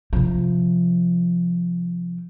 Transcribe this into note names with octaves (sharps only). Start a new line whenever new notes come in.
C3 F3